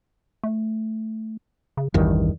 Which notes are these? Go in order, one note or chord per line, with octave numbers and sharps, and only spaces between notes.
A3
C#3
A1 E2 G2 D#3